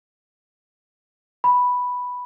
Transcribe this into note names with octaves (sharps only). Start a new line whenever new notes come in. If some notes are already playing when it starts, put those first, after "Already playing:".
B5